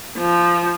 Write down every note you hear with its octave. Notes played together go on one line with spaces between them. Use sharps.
F3